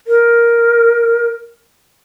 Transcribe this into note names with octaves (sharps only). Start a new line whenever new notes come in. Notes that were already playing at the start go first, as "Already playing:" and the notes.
A#4